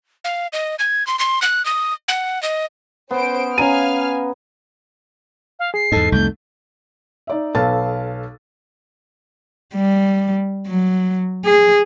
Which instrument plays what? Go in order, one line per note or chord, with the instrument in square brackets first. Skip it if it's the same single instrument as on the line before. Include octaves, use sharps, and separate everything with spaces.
[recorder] F5
D#5
G#6
C6
C6
F#6
D#6
F#5
D#5
[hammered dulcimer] B3 [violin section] C#4 C5 D7
[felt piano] C#4 A#5 D#7 [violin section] F5 G#5 F6
[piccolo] F5
[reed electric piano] G#4 [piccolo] C7
[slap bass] E2 G#2 [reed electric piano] D#4 A4
[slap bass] C2 F2 A3 [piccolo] G6
[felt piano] D#4 D5 E5
B1 A4 B4 F5 A5 A6
[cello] G3
F#3
G#4